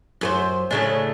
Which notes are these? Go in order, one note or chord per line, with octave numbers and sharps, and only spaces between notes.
F#2 B4 C5
A2 C#3 D4